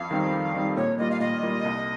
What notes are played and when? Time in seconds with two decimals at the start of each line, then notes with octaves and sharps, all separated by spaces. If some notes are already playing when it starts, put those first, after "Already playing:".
Already playing: F2 F5
0.11 D#3 G3 C4 D#4
0.33 F2
0.54 D#3 G3 C4 D#4
0.76 A#2 C#5
0.98 G3 A#3 F4 D#5
1.11 F5
1.20 A#2 D#5
1.43 G3 A#3 F4
1.65 C2